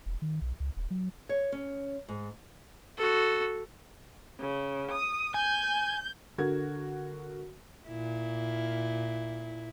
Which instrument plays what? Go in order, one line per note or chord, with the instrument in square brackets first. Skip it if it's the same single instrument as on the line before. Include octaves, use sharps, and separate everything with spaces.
[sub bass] E1
D#3
B1
C#2
D#1
F#3
[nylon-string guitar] C#5
C#4
G#2
[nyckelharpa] F#4 A4
[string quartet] C#3
D#6
[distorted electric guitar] G#5 [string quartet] G6
[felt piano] D3 F#4 A#4 G#6
[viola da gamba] A#2 E4